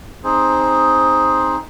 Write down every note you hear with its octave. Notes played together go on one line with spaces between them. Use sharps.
C4 D#4 G#4 C5